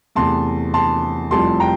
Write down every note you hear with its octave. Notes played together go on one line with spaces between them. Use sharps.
E2 C3 E3 A3 A5 C6
A5 C6
F1 F2 E3 G3 A5 C6
G5 A#5